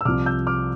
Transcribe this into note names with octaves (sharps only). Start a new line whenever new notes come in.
E6
C2 C3 F3 D6 F6
E6 G6
D6 F6